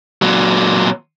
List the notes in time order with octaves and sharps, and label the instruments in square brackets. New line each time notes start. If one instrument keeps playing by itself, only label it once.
[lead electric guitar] A#2 F#3